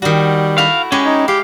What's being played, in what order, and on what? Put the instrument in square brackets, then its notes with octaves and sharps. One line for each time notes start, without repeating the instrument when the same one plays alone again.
[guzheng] D#3 F#4 [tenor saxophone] G3
[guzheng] A3 E4 F#4 [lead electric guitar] F5
[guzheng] G#3 E4 G4 [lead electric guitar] C#4
[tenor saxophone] D#4
[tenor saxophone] G4 [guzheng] F5